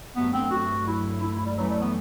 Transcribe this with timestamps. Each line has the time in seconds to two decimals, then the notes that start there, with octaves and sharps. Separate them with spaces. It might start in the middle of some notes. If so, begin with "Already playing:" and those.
0.16 G2 F#3 A3 B3
0.34 C4
0.51 F#4
0.87 E4
1.22 E4
1.34 E4
1.45 G3
1.57 F#2 E3 F#3 A3
1.69 G3
1.81 B3